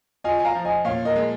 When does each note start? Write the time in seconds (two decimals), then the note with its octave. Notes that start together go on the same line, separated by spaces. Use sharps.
0.24 F4 D#5 G#5
0.40 G#5
0.45 F5 A#5
0.55 F3
0.65 D#5 G#5
0.85 A#2 C#5 F5
1.05 A#4 D#5
1.16 G#3